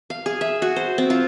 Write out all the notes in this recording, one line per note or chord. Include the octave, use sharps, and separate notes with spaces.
F5
G#4
E5
F#4
C5
C4
F4